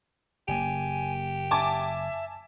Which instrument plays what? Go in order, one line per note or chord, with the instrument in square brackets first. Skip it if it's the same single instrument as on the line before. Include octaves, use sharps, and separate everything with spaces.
[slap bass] F#1 A#3 [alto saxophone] G4 [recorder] G#5
[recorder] E5 [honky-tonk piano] G#5 A5 D6